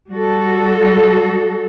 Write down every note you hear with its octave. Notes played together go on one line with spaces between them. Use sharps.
G3 F#4 A4